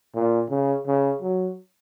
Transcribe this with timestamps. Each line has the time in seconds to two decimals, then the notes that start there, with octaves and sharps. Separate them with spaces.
0.14 A#2
0.50 C#3
0.87 C#3
1.22 F#3